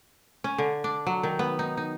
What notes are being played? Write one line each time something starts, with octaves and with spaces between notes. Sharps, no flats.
C#4
D3
D4
F#3
D#3
B3
D#4
D#4